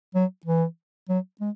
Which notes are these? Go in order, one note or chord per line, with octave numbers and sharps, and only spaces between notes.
F#3
E3
F#3
G#3